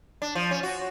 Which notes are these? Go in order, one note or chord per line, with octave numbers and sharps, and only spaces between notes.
D4
F3
C#4
F#4